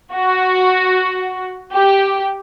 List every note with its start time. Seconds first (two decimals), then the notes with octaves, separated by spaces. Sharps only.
0.13 F#4
1.73 G4